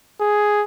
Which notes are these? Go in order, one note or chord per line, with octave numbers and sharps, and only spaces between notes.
G#4